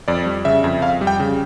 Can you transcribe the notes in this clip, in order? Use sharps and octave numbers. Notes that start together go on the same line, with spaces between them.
F2 D5
G3
C#3 E5
F2
F2 F5
G3
G5
C#3